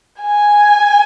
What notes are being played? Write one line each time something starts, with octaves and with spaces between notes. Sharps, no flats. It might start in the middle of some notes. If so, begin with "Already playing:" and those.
G#5